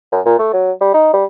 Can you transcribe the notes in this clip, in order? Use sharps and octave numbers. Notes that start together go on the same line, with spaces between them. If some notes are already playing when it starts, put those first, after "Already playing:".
F#2
A#2
A3
F#3
G3
D#4
G3